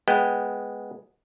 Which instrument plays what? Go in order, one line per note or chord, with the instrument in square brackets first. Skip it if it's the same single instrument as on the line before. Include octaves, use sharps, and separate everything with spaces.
[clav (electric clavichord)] G#3 B3 G5